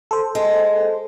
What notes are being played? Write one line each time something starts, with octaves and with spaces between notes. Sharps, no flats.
A4 C5
G#3